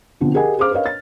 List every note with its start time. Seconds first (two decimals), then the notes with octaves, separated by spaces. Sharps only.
0.21 B2 D3 F3 C4
0.34 G4 G#4 A#4 D#5 F#5 G#5
0.59 G#4 C5 F5 D6 F6
0.71 A#4 B4 C#5 D#5 F5
0.86 A6